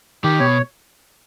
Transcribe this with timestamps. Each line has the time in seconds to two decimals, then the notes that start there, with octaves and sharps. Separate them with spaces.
0.24 D#3 G4
0.40 B2 C#5